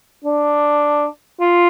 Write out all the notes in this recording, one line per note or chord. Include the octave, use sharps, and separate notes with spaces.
D4
F4